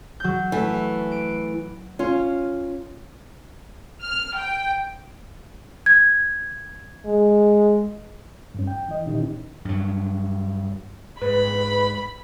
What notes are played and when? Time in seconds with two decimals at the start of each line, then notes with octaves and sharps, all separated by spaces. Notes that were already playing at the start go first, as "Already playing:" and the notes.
0.20 F#3 G6
0.52 E3 A3
1.12 D7
1.99 C#4 F4
4.02 F6
4.37 G5
5.86 G#6
7.06 G#3
8.54 G2 C#4
8.67 G5
8.89 E3 D#5
9.06 A#2 D#3 C#4 D#4 E4 G4
9.65 G2 F#3
11.22 G#2 B4 B5